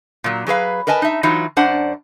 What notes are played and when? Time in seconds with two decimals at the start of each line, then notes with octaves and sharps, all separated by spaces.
0.24 A#2 F#3
0.47 F#3 G#4 B4 F5
0.87 A#4 B4 D#5 G#5 A5
1.02 D#4 E5
1.23 E3 F#3 D#4 F4
1.57 F#2 D4 C5 D5 F#5